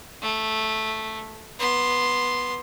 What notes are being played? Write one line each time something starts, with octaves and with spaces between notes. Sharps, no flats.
A3
B3 C6